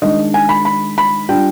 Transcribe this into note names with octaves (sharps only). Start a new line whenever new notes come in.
D#3 G#3 D4 D#5
G#5
B5
B5
B5
G3 D4 F4 G5